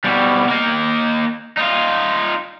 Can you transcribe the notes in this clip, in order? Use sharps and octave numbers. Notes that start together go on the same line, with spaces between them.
B2 G3
A#3 D#4
D#4 F4